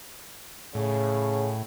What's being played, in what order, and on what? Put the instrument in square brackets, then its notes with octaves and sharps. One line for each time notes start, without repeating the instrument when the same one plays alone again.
[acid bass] A2 [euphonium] C#3